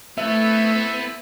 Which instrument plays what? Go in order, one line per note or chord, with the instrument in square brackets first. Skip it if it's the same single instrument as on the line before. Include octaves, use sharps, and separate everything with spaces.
[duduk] A3 [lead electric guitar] B3 [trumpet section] C4 E4 A4 [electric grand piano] E5